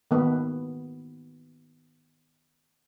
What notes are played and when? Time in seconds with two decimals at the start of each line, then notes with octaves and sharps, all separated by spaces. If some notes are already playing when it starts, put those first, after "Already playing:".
0.11 D#3 A#3 B3 B4